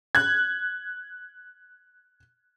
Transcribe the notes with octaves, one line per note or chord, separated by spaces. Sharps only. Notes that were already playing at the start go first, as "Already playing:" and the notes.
F#6 G#6